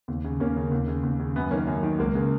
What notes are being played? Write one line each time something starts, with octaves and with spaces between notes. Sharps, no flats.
D#2
C#3
D#2 A#3 C#4
C#3
D#2
C#3
D#2
C#3
F#2 B3
D#3 A#3 C#4
F#2
D#3
C#2 A#3
C#3